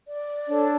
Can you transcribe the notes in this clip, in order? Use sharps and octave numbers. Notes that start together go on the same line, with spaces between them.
D5
D4 A4 C#5